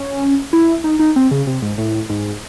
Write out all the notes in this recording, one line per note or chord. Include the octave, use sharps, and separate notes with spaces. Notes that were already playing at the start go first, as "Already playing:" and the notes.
Already playing: C#4
E4
D#4
D#4
C4
C#3
C3
G#2
A2
G#2